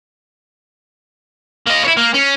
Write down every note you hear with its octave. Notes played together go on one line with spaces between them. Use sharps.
A#3 D#5
E4 C#5
A#3
C#4